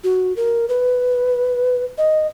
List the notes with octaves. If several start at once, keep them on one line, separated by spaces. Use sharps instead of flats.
F#4
A#4
B4
D#5